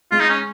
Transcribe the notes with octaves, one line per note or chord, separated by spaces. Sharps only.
G#3 F4
D#4
C#4